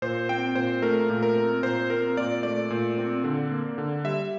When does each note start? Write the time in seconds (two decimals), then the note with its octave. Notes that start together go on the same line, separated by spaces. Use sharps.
0.02 A#2 C5
0.29 C4 G5
0.55 A#2 C5
0.82 A3 A#4
1.10 A#2
1.23 A#4
1.36 C4
1.63 A#2 C5
1.90 C4 A#4
2.17 A#2 D5
2.43 A3 D5
2.70 A#2
2.98 C4
3.24 D3
3.51 A#3
3.78 D3
4.05 G3 E5